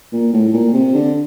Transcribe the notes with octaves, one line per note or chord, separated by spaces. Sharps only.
A#2
A2
A2
A#2
C3
D3